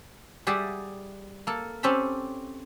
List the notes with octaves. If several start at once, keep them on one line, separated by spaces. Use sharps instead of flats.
G3 G4 G#4 D5 E5 F#5
A#3 A4
C4 C#4 G4 A4 B5